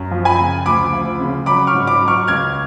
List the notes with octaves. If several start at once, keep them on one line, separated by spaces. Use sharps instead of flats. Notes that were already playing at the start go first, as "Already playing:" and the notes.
Already playing: F#2
F3
G#5 B5
C#3
D2 B5 D6
F3
C#3
F#3 B5 D6
C#6 F6
G#2
B5 D6
F#3
C#6 F6
C#2 F6 G#6